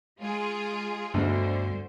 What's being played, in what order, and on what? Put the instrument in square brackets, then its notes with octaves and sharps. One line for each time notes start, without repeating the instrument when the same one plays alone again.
[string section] G#3 F4 G#4
[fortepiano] D2 B2 [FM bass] G2 [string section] D3 C5